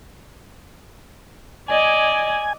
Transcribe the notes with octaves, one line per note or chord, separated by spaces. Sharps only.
D5 D#5 G#5